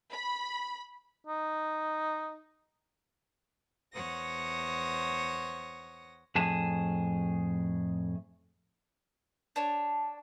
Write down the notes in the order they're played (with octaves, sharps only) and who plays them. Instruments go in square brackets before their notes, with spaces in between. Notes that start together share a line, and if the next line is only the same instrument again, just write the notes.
[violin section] B5
[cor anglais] D#4
[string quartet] E2 C5 C#5 F#5 D#6 A#6
[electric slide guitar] F2 A2 G#4 A5
[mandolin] D4 C#5 A5